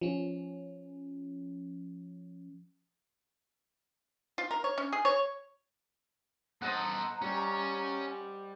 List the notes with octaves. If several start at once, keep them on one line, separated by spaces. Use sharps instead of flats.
F3 C#4
F4
A#4
C#5
C#4
G#4
C#5
B3 A4 C5 D#5 F#5 A#5
G3 C#4 C#5